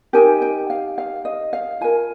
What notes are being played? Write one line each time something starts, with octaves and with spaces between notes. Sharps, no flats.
D#4 G4 A#4 G#5
G5
F5
F5
D#5
F5
F4 A#4 G#5